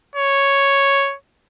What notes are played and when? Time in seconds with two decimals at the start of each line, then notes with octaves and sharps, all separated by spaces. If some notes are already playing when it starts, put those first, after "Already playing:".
0.15 C#5